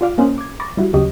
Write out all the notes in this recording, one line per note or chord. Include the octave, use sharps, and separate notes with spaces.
F4 D5 F5 D6
A#3 C#4 C5 D#5 F#6
D6 G#6
B5 C#6 D6 A6 A#6
G3 E4 F#4
D#2 C#3 F#3 G4 C#5 D#5